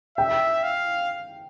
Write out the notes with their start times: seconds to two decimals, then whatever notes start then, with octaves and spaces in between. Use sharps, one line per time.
0.18 E5 G5
0.63 F5